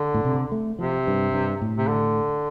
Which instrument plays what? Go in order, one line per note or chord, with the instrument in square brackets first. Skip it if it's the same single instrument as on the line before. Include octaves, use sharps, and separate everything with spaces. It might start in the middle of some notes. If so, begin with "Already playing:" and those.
Already playing: [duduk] D3
[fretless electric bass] A2
C3
A3
[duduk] C3 [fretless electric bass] F3
[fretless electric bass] G2
G2
A2
[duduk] C3
D3